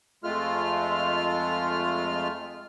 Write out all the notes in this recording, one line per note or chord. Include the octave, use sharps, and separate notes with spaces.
F2 G#3 A3 F4 F6